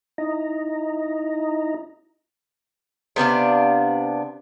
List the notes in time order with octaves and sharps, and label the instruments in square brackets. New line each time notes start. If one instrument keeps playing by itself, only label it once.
[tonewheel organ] D#4 E4 D#5 A#5
[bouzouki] C3 B3 D4 F5